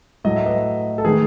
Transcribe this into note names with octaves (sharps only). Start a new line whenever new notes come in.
A2 F#3 A3 D#5
E5
B4 D#5
A4
D#3 A3 G#4 B4